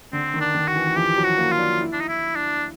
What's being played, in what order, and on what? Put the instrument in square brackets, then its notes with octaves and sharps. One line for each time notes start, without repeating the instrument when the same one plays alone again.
[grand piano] D3 [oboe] C4
[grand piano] D#3
[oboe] D4
[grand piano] D#3
[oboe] F#4
[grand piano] E3
E3
[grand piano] F3 [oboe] G4
[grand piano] F#3
[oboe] F#4
[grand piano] A#3
[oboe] F4
[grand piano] D4
E4
[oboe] D4
D#4
E4
D4